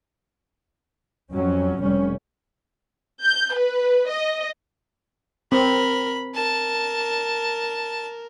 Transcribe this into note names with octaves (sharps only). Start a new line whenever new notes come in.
F2 F#3 C#4
F1 G3 C#4
G6
B4
D#5
C4 A#4 B5
A#4 A5